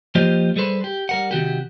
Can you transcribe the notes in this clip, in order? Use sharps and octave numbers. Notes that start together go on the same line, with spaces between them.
F3 A#3 F4 G4 C5 D#5
G3 G#4 A4 B4 C5
G4
G3 A#4 F#5
C3 D#3 F#4 G4